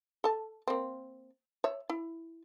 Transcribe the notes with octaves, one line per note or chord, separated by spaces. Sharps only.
A4 A5
A#3 C4
C#5 E5
E4